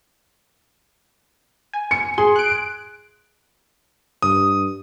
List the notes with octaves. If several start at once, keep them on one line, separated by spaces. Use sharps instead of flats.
G#5
C#7
G#4 C6
F#6 D7
G2 D#6